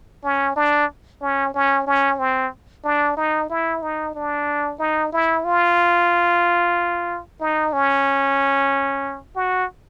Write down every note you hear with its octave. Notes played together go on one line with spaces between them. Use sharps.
C#4
D4
C#4
C#4
C#4
C4
D4
D#4
E4
D#4
D4
D#4
E4
F4
D#4
C#4
F#4